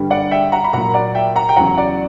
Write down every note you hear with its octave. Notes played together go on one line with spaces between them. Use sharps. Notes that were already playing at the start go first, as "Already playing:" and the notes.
Already playing: G2 D3 G3
D5 F#5
E5 G5
F#5 A#5
B5
A#2 F#3 F#5 A#5
D5 F#5
E5 G5
F#5 A#5
G5
E2 C#3 F#3 F#5 A#5
D5 F#5